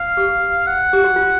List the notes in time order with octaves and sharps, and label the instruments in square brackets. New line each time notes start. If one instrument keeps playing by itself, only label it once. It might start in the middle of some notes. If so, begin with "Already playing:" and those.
Already playing: [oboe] F5
[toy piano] G4
[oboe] F#5
[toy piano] G4
F#4
F4